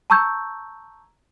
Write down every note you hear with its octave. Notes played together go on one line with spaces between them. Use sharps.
A5 A#5 C#6 E6 G6 G#6